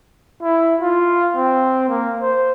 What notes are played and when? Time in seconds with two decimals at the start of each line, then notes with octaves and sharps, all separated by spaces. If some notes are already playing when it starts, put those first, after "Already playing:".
0.42 E4
0.81 F4
1.36 C4
1.89 A#3
2.21 C5